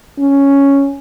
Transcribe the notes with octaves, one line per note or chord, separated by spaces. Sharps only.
C#4